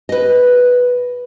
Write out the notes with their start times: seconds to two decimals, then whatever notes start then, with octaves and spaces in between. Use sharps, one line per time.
0.09 B4 D#5